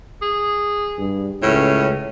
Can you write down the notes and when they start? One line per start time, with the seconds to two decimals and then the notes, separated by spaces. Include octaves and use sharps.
0.22 G#4
0.98 G2
1.42 C#2 A2 C#4